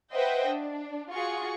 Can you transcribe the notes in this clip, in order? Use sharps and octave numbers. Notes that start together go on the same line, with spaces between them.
B4 C5 D#5 E5 F#5 G5
D4
F4 F#4 G#4 C#6